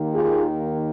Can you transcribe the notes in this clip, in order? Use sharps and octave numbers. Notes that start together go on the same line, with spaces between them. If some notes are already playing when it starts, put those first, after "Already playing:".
Already playing: D#2 D#3 A#3
F4 G#4